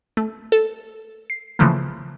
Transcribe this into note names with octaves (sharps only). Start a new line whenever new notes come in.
A3
A4
C7
C#3 E3 F3 A3 A#3